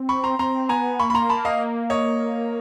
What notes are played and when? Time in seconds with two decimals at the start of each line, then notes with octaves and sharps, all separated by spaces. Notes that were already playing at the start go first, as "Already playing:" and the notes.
Already playing: C4
0.09 B5 C#6
0.24 A#5 C6
0.39 C4 A#5 C6
0.69 B3 G#5 A#5
0.99 A#3 B5 C#6
1.10 B5
1.14 A#5 C6
1.29 A5 B5
1.45 D#5 F5
1.90 C#5 D#5